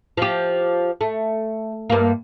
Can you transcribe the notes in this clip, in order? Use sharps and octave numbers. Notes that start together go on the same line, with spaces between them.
F3 G4
A3
G2 A#3